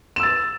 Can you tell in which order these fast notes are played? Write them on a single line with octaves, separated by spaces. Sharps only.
E7 E6 A6